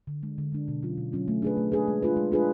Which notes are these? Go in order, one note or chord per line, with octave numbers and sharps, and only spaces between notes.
D3
G#3 D4
D3
G#3 D4
B2
F#3 C#4 F4
B2
F#3 C#4 F4
A3
D4 G#4 B4
A3
D4 G#4 B4
G#3
D4 F4 G#4 B4
G#3
D4 F4 G#4 B4